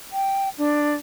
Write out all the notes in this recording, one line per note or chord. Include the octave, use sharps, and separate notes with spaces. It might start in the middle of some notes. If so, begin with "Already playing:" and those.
G5
D4